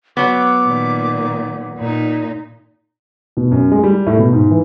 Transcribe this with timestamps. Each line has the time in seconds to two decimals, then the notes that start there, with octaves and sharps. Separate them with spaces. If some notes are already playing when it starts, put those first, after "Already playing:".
0.17 F#3 B3 D6
0.65 A#2 D#3
1.78 A#2 D#4
3.37 B2
3.52 F#2
3.72 G#3
3.84 G3
4.07 A2
4.19 B2
4.33 G#2
4.51 E3